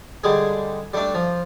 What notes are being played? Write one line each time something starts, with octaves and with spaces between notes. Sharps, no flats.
D3 G3 G#3 G#4
G3 A3 D4
F3